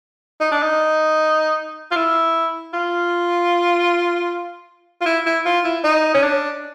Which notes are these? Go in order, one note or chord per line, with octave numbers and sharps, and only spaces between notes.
D#4
D4
D#4
F4
E4
F4
F4
E4
E4
F4
E4
D#4
C#4
D4